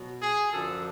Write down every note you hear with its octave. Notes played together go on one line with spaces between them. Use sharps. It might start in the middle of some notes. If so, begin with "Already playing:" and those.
Already playing: B2 F#3
G#4
F#2 D3 F3 A4